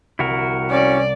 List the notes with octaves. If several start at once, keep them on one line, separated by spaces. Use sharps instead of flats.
C2 E4 F#4 A#4
C#4 D5